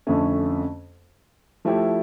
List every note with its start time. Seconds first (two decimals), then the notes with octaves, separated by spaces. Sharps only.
0.07 F2 D3 A3 C#4
1.65 F3 A3 E4 G4